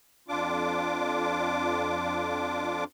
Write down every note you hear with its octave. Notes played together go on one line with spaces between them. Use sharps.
F2 D4 F4 D6